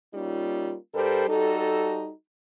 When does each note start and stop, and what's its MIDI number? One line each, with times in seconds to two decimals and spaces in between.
0.14 0.75 55
0.14 0.75 58
0.14 0.75 61
0.14 0.75 63
0.14 0.75 65
0.94 1.24 43
0.94 1.24 55
0.94 1.24 67
0.94 1.24 69
0.94 1.24 70
0.94 1.24 72
1.28 2.12 55
1.28 2.12 63
1.28 2.12 66
1.28 2.12 69